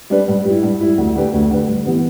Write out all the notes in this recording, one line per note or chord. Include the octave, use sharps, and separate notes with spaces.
G3 D4 B4
G2
G3 E4
G2
G3 E4
D2
D3 A3 G4 B4
D2
D3 A3 G4 B4
G2
E3 B3 G4 B4